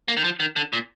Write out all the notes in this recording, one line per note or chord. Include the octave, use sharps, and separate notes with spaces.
A#3
D#3
F3
D#3
D3
A#2